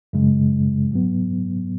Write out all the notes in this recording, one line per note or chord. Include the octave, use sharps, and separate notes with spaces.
F#2 C#3 G#3
G#2 F#3 B3